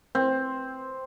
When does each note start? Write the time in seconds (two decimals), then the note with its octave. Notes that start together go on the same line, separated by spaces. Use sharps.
0.15 C4